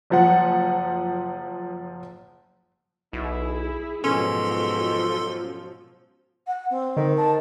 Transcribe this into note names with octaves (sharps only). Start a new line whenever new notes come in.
F#1 F3 F#5
B1 E4 G#4
G#2 B2 F3 F#3 C#4 A4 C6
F#5
C4
D3 D#3
A5